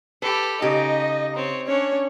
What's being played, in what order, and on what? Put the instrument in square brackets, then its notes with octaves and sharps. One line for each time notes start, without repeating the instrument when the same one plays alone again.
[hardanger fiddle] G4 A4 [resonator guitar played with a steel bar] B4
[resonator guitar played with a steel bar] C#3 G4 [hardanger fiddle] D#4 [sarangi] D#5
[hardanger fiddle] C4 C#5
[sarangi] C#4 [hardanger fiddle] D4 C#5